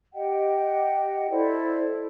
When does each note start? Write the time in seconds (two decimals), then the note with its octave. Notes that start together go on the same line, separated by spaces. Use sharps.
0.14 G4 D#5 F#5 G5
1.30 E4 A4 C5 D5